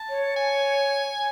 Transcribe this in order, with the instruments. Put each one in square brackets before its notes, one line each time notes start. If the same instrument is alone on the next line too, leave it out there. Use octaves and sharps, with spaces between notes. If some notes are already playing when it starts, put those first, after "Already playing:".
Already playing: [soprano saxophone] A5
[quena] C#5
[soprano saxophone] G#5